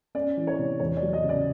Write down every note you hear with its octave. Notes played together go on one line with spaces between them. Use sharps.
C#4 D5
E3
C#5
C3
E2 C#5
D5
F#3
D#5
C#3
D5